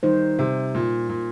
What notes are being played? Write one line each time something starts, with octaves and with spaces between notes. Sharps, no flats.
D#3 G3 D#4 C5
C3
A#2
A#2